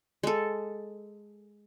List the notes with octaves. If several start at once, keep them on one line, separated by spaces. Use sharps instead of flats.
G#3 A4